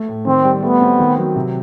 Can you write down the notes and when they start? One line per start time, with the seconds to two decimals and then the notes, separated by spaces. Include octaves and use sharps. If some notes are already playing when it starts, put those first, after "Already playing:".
Already playing: A3
0.08 A2
0.26 D#3 C4
0.44 G3
0.62 A3 B3
0.81 C4
0.99 D#3
1.17 F#3
1.36 C3